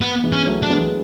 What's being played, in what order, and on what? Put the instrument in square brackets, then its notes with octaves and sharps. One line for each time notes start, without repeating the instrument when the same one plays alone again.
[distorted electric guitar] B3
[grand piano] E3 G#3
[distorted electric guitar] C#4
[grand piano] F#3 A3
[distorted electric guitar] D4
[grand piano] G#3 B3